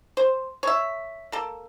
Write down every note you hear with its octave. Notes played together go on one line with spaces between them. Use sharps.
C5
C#5 E5
A#3 A4